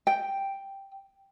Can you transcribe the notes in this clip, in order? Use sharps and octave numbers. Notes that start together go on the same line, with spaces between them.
G5